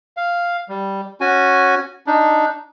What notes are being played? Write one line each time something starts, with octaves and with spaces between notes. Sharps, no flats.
F5
G3
C#4 F#4 G#5
D4 D#4